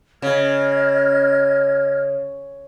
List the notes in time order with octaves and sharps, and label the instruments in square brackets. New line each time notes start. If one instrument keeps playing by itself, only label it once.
[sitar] C#3 [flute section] D#5 F6 G#6